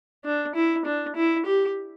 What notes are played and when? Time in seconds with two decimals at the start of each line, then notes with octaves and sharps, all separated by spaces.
0.25 D4
0.55 E4
0.85 D4
1.16 E4
1.46 G4